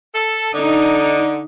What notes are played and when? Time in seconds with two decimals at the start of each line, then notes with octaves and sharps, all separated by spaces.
0.15 A4
0.54 D3 D#4